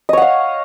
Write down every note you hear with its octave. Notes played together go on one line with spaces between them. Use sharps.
C#5 D#5 F5 F#5